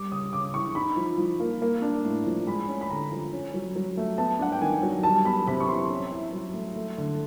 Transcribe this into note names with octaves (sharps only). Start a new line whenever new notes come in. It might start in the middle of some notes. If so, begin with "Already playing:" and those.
Already playing: G3 D6
C#3 D#6
C#3 D6
E3 C#6
D#4 B5
F3
F3
A#3
A#3
D4
A2
F3
G#3 B5
C#4
B5
D3 A#5
F3
C#4
F#3
F#3
A3
B3 A5
D4 F#5
G5
D#3 G#5
F#3
G3 A5
B3 B5
C3 B5
C#6
E3 C6
C#4
E4
F#3
A3
A3
D3